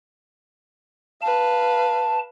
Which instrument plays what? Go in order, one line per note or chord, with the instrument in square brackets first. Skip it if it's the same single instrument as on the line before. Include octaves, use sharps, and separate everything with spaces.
[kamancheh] B4 F5 [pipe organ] A5